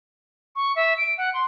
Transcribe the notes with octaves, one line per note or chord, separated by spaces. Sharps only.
C#6
E5
D7
F#5
C6